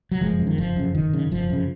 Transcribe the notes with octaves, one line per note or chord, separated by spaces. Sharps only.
F#3
F#1 F3 G#3
F#2 C#3
D#3
F#1 F3
F#2 C#3
F#1 D#3
F#2 C#3
F#1 F3
F#2 C#3